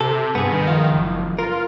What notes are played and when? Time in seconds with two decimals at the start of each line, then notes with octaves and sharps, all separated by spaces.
0.01 C3 A4
0.35 G2 B3 G#4
0.51 D#3
0.68 C#2 F3 F5
0.91 F#1
1.39 F4 A#4